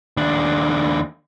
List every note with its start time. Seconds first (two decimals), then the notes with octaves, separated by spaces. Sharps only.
0.17 D#2 D4